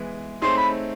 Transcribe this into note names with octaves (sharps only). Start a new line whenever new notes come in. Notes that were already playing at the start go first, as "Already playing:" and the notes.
Already playing: E3 G#3 B3
A3 C4 D#4 G#4 C#5 C6
B5